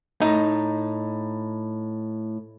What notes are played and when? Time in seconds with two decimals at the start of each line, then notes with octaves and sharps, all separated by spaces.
0.22 A2 D#4